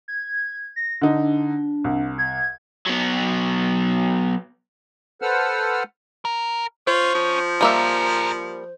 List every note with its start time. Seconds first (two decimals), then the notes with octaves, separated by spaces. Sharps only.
0.08 G#6
0.76 A#6
1.02 D3 D4 D#4
1.84 C2
2.18 G#6
2.86 F#3 B3
5.22 A4 B4 C5 F#5 E6 F6
6.25 A#4
6.87 C#4 F4 C5 C#5
7.15 F3
7.61 G3 A#3 G#4 A#4 E5